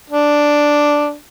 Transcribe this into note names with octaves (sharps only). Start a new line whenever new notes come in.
D4